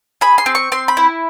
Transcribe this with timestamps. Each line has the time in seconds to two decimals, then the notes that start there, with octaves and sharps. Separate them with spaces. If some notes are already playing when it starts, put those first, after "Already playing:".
0.21 G#4 B5
0.38 C6
0.46 C4
0.55 C#6
0.72 C4 C6
0.88 B5
0.97 E4